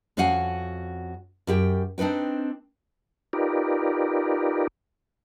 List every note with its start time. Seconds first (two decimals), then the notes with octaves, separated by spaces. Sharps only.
0.17 F2 C#4 F#4 F5 F#5 G#5
1.47 F#2 G4 G5
1.98 C4 D4 D#4 B4 G5
3.33 D#4 F4 G4 A#4 B4 D5